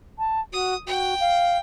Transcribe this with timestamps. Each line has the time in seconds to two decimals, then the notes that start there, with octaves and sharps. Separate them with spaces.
0.19 A5
0.53 F#4 D#6
0.87 F#4 G5
1.20 F5